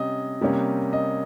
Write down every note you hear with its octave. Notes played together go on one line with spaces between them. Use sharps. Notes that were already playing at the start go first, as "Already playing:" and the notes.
Already playing: C3 G3 C#4 D#5
C3 G3 A#3 C#4
D#5